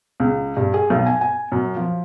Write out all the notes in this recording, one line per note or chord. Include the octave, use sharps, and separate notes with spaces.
C#2
G2
G#4
B1
G#5
G#5
F#2
F3